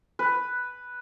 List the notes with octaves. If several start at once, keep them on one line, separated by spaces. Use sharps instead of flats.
B4